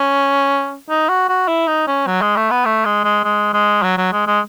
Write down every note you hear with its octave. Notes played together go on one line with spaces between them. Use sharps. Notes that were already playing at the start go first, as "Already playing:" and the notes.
Already playing: C#4
D#4
F#4
F#4
E4
D#4
C#4
F#3
G#3
A3
B3
A3
G#3
G#3
G#3
G#3
F#3
F#3
G#3
G#3